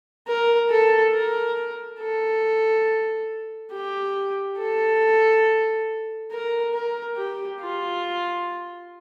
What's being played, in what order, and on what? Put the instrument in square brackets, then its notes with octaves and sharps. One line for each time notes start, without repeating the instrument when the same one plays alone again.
[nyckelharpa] A#4
A4
A#4
A4
G4
A4
A#4
A#4
G4
F4